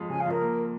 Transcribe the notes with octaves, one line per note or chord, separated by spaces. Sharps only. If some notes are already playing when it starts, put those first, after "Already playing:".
Already playing: F2 G#3 F4
C#3 G#5
F5
F2
A#4
A#3